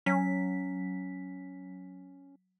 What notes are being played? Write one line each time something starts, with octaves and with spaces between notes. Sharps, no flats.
F#3 C#4 B6